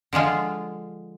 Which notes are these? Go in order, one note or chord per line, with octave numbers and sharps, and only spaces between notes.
D3 F3 G#3 F4